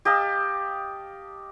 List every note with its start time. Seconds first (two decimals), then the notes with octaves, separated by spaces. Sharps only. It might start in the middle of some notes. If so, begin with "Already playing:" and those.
0.05 G4 D#5 F5 A5